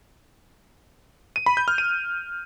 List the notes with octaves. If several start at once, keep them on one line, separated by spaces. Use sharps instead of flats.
D#7
B5
G6
F6
D#7